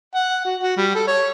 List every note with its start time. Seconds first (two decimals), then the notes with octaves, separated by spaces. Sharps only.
0.15 F#5
0.45 F#4
0.62 F#4
0.77 G3
0.95 A4
1.07 C#5